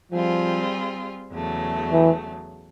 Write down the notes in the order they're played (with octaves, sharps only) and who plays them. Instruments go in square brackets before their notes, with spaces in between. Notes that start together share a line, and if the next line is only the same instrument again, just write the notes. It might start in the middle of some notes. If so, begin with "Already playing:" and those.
[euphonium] F3 [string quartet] G3 C4 F4 G#4
[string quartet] E2 C#3 F#3 A3
[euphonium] E3